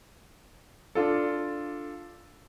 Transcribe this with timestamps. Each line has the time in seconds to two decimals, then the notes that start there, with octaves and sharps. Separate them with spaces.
0.95 D4 F4 A4